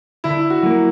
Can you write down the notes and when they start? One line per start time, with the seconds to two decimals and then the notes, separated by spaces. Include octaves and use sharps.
0.24 D3 E4
0.50 F#4
0.63 F#3 A#3